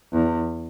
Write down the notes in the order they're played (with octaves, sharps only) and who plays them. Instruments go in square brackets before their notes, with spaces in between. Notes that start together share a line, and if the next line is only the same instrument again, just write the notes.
[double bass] E2